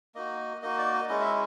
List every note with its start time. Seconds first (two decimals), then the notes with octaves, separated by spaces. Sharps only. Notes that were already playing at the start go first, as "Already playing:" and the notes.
0.15 A#3 D#4 F#4 D#5
0.62 A#3 D#4 F#4 D#5
0.78 D5
0.94 D#5
1.09 G#3 C#4 E4 D#5
1.21 E5